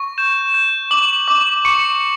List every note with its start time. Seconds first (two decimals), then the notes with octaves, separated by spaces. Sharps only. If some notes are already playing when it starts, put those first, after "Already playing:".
Already playing: C#6
0.18 G6 E7
0.54 G6
0.91 D6 F#7
1.28 D6
1.65 C#6 C#7